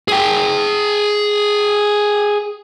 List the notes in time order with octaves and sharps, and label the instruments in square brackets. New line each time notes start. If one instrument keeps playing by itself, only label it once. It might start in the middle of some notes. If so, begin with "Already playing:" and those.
[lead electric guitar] G#4 G5